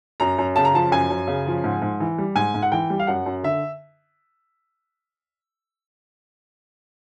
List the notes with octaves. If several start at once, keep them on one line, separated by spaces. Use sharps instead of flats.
F#2 A#5
F#2
C#3 A5
A#5
F3 A5
F#2 G#5
F#2
C#3
F3
G#2
G#2
E3
G3
G#2 G#5
G#2
F#5
E3 G5
G3
F5
F#2 F#5
F#2
D3 E5